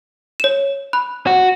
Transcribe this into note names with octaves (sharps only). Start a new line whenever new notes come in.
C#5 E7
B5 F#6
F#4